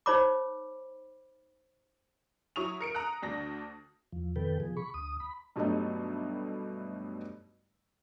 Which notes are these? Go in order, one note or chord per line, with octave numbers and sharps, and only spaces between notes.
D#4 C5 C#5 B5 D6
F#3 E4 C#6 D#6 F7
A#4 C#7 D7
A#5 D#6 F#6
D2 D4 A#6
E2 F3
F2 B2 D#3 A4 B4 G5
B2 F3 G#4
B5 C#6
D2 D#6
B5
G2 B2 F#3 G3 A3 D#4